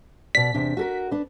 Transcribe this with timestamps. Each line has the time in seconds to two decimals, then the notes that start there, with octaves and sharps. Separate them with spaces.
0.35 B2 D5 B6
0.54 E2 C3 D4
0.77 F#4 A4 A#4
1.11 D4 B4